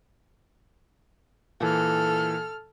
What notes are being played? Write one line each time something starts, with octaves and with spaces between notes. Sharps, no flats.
A#2 E3 A4 F6